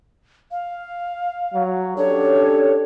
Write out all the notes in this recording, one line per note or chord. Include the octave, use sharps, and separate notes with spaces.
F5
F#3
C#4 D4 G4 A4 C#5